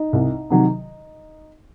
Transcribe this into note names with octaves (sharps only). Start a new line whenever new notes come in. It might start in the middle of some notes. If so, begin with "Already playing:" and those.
Already playing: D#4
C2
C3 D#3 F#3